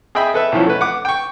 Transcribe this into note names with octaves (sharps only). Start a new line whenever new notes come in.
G#4 D#5 E5 G5 B5
A4 B4 E5
B1 E3 F3 C#4
A3 B4
F#5 D6
G5 C#6